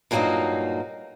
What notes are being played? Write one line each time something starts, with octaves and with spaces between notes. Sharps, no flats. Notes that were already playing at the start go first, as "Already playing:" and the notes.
G2 A#2 F#3 G3 A#3 D#4